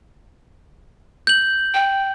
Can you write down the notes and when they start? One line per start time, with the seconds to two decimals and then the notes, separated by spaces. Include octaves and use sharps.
1.27 G6 F#7
1.74 G5